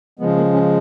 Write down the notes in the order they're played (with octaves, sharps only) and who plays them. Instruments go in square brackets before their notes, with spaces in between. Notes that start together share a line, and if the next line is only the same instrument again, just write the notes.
[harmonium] C#3 F3 G#3 B3
A#3
C#4